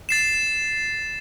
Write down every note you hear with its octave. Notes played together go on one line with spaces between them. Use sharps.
A6 C7 E7